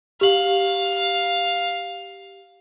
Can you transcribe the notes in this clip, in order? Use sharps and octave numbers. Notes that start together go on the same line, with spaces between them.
G4 F5 F#7